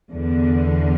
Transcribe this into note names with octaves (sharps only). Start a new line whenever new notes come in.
E2 D3